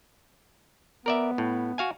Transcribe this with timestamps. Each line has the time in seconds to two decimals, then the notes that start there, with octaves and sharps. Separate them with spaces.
1.06 B3 A#4 D5 E5
1.38 A2
1.78 F#4 F5 G#5